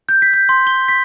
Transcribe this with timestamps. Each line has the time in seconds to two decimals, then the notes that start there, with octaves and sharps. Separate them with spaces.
0.09 G6
0.22 B6
0.33 G6
0.49 C6
0.67 G7
0.88 B6